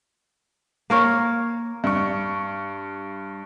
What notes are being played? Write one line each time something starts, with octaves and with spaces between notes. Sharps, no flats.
A#3 A#4 C#5
G2 C#6